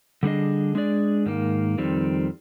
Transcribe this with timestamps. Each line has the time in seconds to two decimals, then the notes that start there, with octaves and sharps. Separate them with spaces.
0.23 D3 G3 D4 G#4 D#5
0.75 G#3 D4 G#4 D5
1.26 G#2 D#3 A#3
1.78 F2 D#3 G3 C4